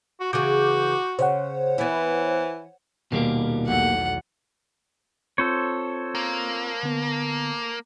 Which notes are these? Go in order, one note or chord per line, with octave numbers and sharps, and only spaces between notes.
F#4
C#3 E3 F#4 G#4 D6 G6
C#3 C5 C#5 F#5
E3 B3 E4
D#1 B2 G3 A#3 A#4 C7
B1 E2 A3 F#5
C4 F4 A4 C5 C#5
A#3
D3 B3